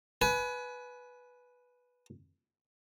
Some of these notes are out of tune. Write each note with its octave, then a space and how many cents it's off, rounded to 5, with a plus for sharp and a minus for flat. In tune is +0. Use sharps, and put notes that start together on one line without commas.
B4 +0 G#5 +30